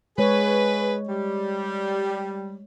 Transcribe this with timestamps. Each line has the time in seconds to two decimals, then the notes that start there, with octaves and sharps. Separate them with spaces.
0.18 G#3 G#4 B4 C#5
1.08 G3